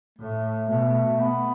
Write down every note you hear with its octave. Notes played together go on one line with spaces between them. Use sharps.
A2 A3
B2 A3
B3